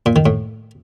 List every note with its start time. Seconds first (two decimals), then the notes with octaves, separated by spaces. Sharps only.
0.06 A#2
0.16 D#3
0.26 A2